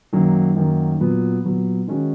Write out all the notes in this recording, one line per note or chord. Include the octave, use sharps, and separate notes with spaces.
F#2 D#3 F#3 A#3
F#2 D#3 F#3 A#3
A#2 F#3 B3
A#2 F#3 B3
D#3 G#3 C#4 F#4